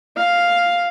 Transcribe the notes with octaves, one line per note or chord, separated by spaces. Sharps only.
F5